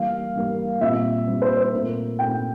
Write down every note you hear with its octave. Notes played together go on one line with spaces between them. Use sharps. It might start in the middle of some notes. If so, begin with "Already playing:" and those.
Already playing: E3 G3 A#3 F5
E3 G3 A#3
A#2 G3 C4 E5
A#2 G3 C4
C5
C5
A#2 A3 C4 A#4
A#2 A3 C4 G5